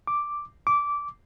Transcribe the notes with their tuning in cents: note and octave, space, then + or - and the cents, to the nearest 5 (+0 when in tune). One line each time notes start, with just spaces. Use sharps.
D6 +0
D6 -15